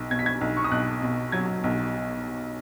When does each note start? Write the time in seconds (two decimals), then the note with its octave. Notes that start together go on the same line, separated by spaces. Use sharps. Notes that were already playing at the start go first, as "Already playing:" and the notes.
Already playing: B1
0.10 B2 G#6
0.19 B6
0.26 G#6
0.41 B1
0.57 C#6
0.64 D#6
0.71 B1 F#6
1.02 B2
1.32 F#3 G#6
1.64 B1